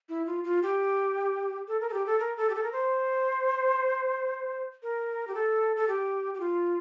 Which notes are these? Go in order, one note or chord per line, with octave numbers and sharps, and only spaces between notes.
E4
F4
F4
G4
A4
A#4
A4
G4
A4
A#4
A4
G4
A4
A#4
C5
A#4
G4
A4
A4
G4
G4
F4